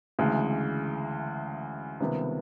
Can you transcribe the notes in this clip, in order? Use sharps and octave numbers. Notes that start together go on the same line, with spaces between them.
D2 C#3 E3 G#3
C#2 C3 D#3 G3 B3